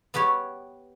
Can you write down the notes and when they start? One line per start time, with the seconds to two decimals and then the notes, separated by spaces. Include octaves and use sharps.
0.14 B3 G4 B4 C#5